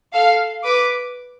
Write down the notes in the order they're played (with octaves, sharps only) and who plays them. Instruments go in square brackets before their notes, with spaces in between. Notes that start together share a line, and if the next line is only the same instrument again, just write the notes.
[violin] A4 [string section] F5
[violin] B4 [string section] D6